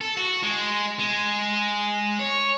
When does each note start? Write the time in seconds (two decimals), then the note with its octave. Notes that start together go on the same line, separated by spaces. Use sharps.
0.01 A4
0.17 F#4
0.43 G#3
0.99 G#3
2.20 C#5